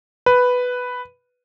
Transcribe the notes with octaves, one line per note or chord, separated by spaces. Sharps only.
B4